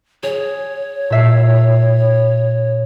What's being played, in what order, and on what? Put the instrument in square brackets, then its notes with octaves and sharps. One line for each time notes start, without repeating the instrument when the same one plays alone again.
[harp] G#4 [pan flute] C#5
[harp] A#2 E5 C7